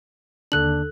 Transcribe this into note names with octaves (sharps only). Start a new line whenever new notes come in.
D#2 D3 D4 A4 F#6 F#7